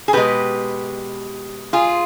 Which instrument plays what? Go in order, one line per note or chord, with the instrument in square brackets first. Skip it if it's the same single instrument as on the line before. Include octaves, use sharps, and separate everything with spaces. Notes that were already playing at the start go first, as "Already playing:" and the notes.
[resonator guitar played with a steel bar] G#4
B2 G#3 G4 B4
F4 G#4